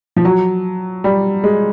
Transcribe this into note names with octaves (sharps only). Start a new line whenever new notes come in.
F3
F#3
G3
G#3